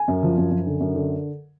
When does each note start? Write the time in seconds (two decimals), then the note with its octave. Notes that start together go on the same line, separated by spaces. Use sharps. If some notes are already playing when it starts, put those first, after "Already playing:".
Already playing: G#5
0.08 F#2
0.23 F3
0.37 F#2
0.51 F#2
0.66 D3
0.80 F#2
0.95 D3